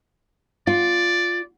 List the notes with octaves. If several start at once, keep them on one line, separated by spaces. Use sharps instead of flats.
F4 D5